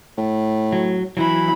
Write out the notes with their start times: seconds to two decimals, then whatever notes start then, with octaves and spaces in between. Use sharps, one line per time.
0.17 A2
0.72 F#3
1.17 E3 F#3 E4 B5